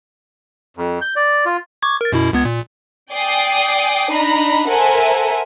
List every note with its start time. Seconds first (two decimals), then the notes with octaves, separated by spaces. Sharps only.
0.77 F2
1.02 G6
1.16 D5
1.46 F4
1.82 C#6 D6 G#6
2.01 A#4 A6
2.12 F#2 B2 E4
2.33 C#2 B3 G#6
2.45 A#2
3.13 D5 G5 G#5 D6 D#6 C7
4.10 D4 D#4 A#5 B5
4.67 A4 A#4 C5 E5 F#5 G#5